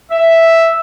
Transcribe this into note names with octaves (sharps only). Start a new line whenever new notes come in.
E5